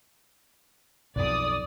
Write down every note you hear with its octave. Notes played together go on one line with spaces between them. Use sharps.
B1 F2 D5 D#6